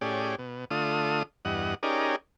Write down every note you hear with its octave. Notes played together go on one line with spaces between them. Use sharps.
A2 C#4 G4 G#4 D5
B2
D3 A3 F4 D#6
E2 G2 D#5 F#5
C#4 D#4 G4 G#4 A#4 D5